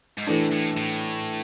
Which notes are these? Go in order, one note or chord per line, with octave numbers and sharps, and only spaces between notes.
G#2
A2 E3 A3 D4
A2
A2